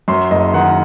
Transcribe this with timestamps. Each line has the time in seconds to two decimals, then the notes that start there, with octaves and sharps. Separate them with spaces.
0.08 F#2 C6
0.31 F#1 D#5
0.54 D#3 F#5